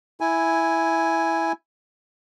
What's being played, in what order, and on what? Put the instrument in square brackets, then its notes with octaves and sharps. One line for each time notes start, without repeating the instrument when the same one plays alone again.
[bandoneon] E4 G#5